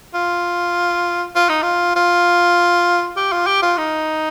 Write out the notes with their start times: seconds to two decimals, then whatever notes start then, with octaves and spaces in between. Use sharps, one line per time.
0.14 F4
1.35 F4
1.49 D#4
1.62 F4
1.96 F4
3.17 G4
3.32 F4
3.46 G4
3.62 F4
3.77 D#4